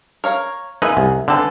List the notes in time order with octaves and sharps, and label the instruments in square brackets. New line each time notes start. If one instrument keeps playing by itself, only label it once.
[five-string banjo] A#4 C#5 F5
[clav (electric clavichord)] G#3 D#4 B4 [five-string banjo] A#3 G#4 E5
[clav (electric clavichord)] C2
[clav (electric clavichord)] D3 C4 [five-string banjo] G#3 A4 B4